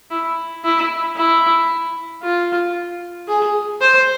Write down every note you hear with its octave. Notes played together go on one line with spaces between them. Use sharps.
E4
E4
E4
F4
G#4
C5